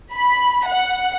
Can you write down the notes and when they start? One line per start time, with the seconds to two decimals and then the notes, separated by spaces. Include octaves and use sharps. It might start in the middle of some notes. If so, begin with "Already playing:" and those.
0.13 B5
0.67 F#5